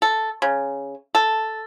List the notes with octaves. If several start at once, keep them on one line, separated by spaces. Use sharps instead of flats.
A4
C#3
A4